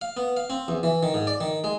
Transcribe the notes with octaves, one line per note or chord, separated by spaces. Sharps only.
F5
B3
F5
C4
E2
E3
D#3
G#2
D5
D#3
G#3